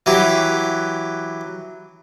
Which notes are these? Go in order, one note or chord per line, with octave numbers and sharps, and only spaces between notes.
E3 F#3 G4